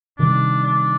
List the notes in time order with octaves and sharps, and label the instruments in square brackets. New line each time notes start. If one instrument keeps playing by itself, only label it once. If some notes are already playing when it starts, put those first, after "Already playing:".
[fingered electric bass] C3 D#3 G3 [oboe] D4
[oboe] D4